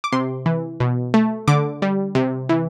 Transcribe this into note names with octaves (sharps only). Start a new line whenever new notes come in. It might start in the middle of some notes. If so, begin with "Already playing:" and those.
D6
C3 C6
E3
B2
A3
D3 D6
G3
C3
E3